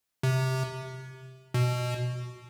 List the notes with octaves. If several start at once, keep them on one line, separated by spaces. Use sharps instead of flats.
C3
B2